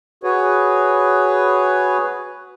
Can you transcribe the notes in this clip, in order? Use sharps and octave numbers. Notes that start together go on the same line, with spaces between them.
F#4 G#4 B4 C#5